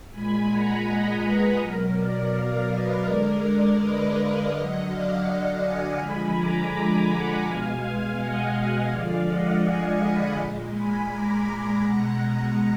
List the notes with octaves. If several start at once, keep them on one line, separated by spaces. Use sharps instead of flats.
A#2 G#3 G#5 B5
F#5 A#5
D#5 F#5
G#4 B4
B2 F#3 A#4
A#4 D5
D5 F5
B4 D#5
D3 G#3 A#4 D5
B4 D#5
D5 F5
D3 F#3 D#5 F#5
D5 F5
F5 G#5
D3 F3 G#3 G#5 B5
A#5 D6
F#5 A#5
B2 G#3 F5 G#5
D#5 F#5
D3 F3 G#3 D5 F5
D#5 F#5
F5 G#5
G#5 B5
A#2 G#3
G#5 B5
A#5 D6
G#5 B5
B2 G#3 F#5 A#5
F#5 A#5